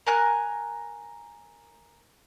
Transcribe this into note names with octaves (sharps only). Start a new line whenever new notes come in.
A#4 G#5 F#6